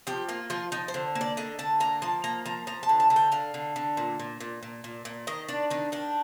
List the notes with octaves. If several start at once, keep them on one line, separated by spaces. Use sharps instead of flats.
F3 G4
A#3 F4
F3 F4
F3 D#4
C5
D3
A#3
D5
D3 D#5
D3 A5
A#3 A#5
F3 A5
A#3 A#5
F3 A#5
F3 A#5
A5
D3
A5
D3
G5
D3 F5
D3
D3
A#2
A#2
A#2
A#2
A#2
A#2
D#3 D#5
D4 D5
D#3 D#4
D#3 D4